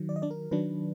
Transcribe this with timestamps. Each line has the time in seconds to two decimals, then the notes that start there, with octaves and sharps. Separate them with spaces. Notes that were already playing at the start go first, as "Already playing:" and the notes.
Already playing: D#3 F#3
0.09 D5
0.16 D#5
0.22 D4 D5
0.31 A#4
0.51 D#3 F#3 D4 B4